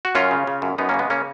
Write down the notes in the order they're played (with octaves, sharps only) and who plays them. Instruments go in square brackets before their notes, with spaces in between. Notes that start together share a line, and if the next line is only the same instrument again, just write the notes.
[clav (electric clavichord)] F#4
F#2 C#4 F4
C#3
C#3
F#2
F#2 B3 D#4
A#3 C#4
C#3
G#3 B3
C#3 A#3 C#4